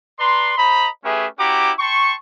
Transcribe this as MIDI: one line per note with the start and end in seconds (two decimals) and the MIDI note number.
0.19 0.53 71
0.19 0.53 74
0.19 0.53 82
0.19 0.53 84
0.58 0.89 72
0.58 0.89 75
0.58 0.89 82
0.58 0.89 83
1.04 1.27 57
1.04 1.27 61
1.04 1.27 67
1.04 1.27 68
1.04 1.27 71
1.04 1.27 76
1.38 1.71 61
1.38 1.71 64
1.38 1.71 66
1.38 1.71 67
1.38 1.71 82
1.38 1.71 86
1.79 2.15 79
1.79 2.15 81
1.79 2.15 84
1.79 2.15 85